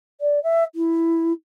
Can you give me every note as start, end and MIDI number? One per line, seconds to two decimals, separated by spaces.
0.21 0.42 74
0.43 0.64 76
0.75 1.32 64